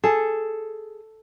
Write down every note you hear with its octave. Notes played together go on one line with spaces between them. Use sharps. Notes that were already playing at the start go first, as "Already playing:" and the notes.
G#4 A4